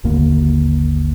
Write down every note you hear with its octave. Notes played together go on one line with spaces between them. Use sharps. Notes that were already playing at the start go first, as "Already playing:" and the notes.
G#1 D#2 D3 A#3